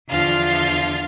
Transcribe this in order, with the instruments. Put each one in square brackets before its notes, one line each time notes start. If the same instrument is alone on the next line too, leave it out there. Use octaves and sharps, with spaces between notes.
[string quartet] E2 D3 F3 F4 F5